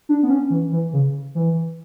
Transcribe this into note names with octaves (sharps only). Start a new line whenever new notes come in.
D4
B3
C#4
E3
E3
C#3
E3